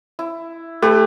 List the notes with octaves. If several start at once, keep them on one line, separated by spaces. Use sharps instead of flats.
E4
A3 G4 B4